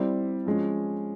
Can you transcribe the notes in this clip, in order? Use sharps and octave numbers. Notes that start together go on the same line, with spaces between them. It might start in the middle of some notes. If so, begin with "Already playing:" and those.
Already playing: G3 C4 E4
F3 G#3 C#4